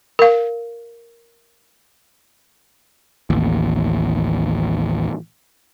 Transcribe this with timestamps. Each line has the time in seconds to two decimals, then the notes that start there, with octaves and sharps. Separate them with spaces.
0.19 A#4 F5
3.30 A1 D#2